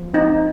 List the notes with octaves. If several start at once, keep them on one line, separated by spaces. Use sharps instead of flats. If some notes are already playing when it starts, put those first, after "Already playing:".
Already playing: F3
C4 D#4